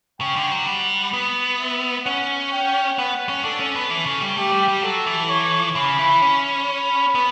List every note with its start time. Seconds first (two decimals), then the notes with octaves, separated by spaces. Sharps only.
0.21 C#3 G5
0.36 D3
0.52 F#3
0.67 G3 F#5
1.13 B3
1.59 E5
2.06 C#4 F#5
2.52 G5
2.98 B3 F#5
3.29 C#4
3.45 D4 A4
3.60 C#4
3.76 B3
3.90 E3
4.06 C#3
4.21 G3
4.37 A3 G4
4.52 G3
4.68 G3
4.83 F#3 A4
5.06 E3
5.29 C#5
5.75 C#3 B5
5.99 E3
6.22 C#4
6.68 B5
7.15 B3